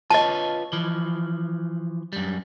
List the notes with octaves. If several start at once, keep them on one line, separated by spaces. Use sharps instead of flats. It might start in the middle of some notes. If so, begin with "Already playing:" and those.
F4 B4 C#5 D#5 A5
E3 F3
F#2 G3